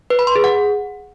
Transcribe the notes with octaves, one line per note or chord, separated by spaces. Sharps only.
B4
B5
C6
G#4
F#5